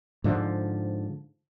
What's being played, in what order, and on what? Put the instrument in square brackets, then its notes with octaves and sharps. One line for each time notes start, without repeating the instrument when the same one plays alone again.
[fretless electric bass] G#2 D3 F3